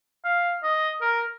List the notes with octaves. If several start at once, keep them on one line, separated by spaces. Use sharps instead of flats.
F5
D#5
A#4